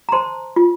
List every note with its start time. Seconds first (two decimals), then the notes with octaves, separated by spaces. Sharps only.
0.09 A#5
0.12 C5 A5 C6
0.56 F4